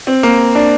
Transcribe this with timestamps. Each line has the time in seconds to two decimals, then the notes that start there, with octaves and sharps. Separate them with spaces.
0.07 C4
0.23 A#3
0.55 D4